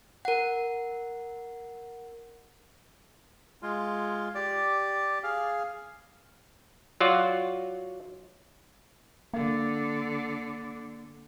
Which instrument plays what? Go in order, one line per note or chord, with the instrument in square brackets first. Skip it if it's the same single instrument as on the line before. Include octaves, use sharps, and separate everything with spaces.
[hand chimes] A#4 F#5
[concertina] G#3 F4
G4 D5
G#4 F5
[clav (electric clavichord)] F#3 F4 F#4 D5
[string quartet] D3 [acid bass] A#3